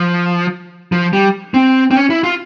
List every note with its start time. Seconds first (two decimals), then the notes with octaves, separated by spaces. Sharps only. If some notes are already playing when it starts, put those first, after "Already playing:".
Already playing: F3
0.92 F3
1.13 G3
1.54 C4
1.91 C4
1.95 C#4
2.10 E4
2.24 F4